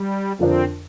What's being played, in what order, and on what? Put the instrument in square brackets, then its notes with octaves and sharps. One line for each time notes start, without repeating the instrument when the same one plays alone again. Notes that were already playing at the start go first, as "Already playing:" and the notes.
Already playing: [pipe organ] G3
[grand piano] F2 D3 F3 D4 A#4 [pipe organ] C4